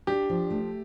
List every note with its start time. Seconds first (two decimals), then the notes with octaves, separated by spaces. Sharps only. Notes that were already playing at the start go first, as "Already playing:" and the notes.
0.07 D4 G4
0.30 F3
0.50 A3